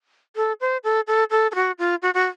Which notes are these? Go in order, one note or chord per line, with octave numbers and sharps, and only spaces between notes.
A4
C5
A4
A4
A4
A4
F#4
F4
F#4
F#4